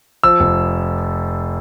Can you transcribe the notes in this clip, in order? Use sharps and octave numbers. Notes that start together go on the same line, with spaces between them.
F3 E6
F1